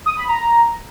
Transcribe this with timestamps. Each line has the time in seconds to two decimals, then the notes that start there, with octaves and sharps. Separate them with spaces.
0.06 D#6
0.17 B5
0.28 A#5